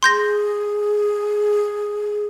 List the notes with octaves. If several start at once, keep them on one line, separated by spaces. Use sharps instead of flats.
G#4 C6 G6 A#6